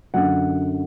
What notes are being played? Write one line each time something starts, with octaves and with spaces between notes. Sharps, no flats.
F#2 D3 F#3 F#5